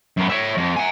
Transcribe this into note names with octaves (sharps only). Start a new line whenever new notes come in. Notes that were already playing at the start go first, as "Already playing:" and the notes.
F#2 B3
C#5 E5
F2
F#5 G#5